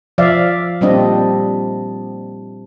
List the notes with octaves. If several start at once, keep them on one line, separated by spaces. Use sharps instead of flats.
F3 D5 E5 F5
A#2 G3 C4 D4 D#5